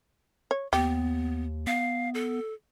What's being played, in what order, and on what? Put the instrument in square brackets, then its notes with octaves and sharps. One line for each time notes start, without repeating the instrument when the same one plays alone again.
[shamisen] C#5
[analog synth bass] D#2 [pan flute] B3 [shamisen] G4
[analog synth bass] B3 [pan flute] F5
[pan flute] A4